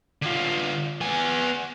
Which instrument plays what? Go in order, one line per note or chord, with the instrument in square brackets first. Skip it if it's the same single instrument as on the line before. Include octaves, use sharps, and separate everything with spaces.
[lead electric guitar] D3 F4
B3 G#5